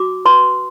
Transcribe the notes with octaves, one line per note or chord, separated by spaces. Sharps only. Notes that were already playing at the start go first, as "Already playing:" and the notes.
Already playing: F#4 D6
B4 C6